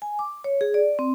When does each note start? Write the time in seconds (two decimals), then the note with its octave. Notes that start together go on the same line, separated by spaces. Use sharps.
0.02 G#5
0.19 D6
0.44 C#5
0.61 G#4
0.74 D5
0.99 C4